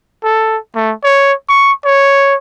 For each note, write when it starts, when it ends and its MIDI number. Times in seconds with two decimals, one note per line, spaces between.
0.24 0.58 69
0.75 0.93 57
1.04 1.33 73
1.49 1.72 85
1.85 2.35 73